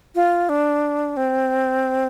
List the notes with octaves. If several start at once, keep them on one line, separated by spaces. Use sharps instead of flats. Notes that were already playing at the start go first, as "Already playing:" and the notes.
F4
D4
C4